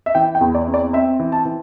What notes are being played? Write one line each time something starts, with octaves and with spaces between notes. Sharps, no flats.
E5
E3 G5
G5
E2
D5
C4
D5
C4 E5
E3
A5
E3